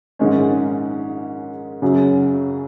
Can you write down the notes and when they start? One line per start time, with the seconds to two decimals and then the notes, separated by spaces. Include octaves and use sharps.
0.19 A#1 G#2 D#3 G#3 C#4
1.82 F#2 C#3 F#3